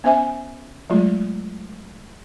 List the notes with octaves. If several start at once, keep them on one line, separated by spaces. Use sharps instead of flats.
B3 C#4 C5 E5 G#5
F#3 G#3 A3 F4